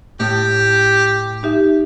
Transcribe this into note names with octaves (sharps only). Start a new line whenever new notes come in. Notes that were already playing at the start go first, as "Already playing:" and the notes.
A2 G4
D#4 G4 E5